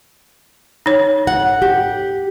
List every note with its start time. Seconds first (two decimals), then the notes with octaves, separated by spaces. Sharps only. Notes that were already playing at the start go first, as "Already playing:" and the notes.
0.86 D#4 C#5
1.27 F#5
1.62 G4